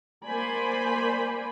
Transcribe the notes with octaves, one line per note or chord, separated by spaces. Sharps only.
A#3 C5 D5 G#5 B5